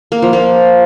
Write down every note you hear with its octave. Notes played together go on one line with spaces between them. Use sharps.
A#3
F3
A#3